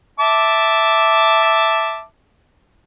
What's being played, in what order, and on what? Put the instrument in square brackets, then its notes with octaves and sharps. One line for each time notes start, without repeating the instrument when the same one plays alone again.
[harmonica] E5 A5 D6